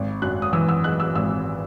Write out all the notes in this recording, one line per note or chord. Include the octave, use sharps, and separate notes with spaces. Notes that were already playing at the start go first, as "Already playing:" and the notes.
Already playing: G#1
F#2 F#6
D#6
E3 E6
E6
G#3 F#6
E6
G#1 E6